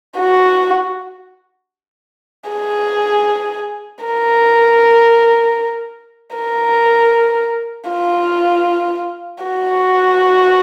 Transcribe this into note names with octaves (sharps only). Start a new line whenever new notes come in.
F#4
G#4
A#4
A#4
F4
F#4